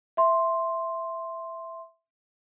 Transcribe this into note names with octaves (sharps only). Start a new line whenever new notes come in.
E5 C6